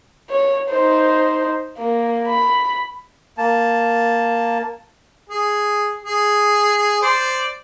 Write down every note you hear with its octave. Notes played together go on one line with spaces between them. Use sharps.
C#5
D#4 C5
A#3
B5
A#3 A5
G#4
G#4
C5 D5